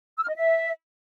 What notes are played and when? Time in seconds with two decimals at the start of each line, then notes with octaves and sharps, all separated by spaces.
0.16 E6
0.22 F6
0.29 D#5
0.35 E5